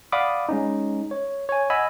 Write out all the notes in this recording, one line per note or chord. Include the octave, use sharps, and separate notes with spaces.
D5 F5 F#5 B5 D6 D#6
G#3 C#4 D#4
C#5
C#5 G#5
D#5 F#5 G#5 B5 E6